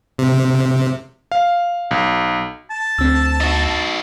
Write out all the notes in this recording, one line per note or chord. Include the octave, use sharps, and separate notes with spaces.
C3
F5
B1
A5
D2 C4 E6
D#4 F#4 E6